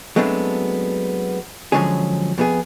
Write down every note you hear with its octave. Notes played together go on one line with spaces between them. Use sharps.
F#3 G#3 A3 B3 C4 D4
D3 F3 F#3 G#3 C#4 G#4
F2 B3 G#4